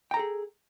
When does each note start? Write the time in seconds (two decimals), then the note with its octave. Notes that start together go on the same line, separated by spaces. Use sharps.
0.11 G5
0.14 A#5
0.17 A4
0.19 G#4